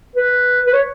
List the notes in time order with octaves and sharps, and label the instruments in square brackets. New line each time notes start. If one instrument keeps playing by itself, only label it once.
[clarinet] B4
B4
C#5